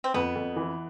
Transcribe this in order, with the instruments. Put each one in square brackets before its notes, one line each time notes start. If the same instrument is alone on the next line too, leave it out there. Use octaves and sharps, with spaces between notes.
[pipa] C4
[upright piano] F2 [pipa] B3
[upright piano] F2
E3